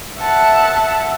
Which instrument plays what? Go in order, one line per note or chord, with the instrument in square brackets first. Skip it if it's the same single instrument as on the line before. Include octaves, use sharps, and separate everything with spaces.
[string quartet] E5 F#5 A5